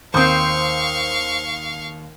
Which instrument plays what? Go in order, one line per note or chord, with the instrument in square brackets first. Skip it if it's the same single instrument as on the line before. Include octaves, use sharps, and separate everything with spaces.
[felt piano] D#2 D#6 [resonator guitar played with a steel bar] C4 C5 [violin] F5 C#6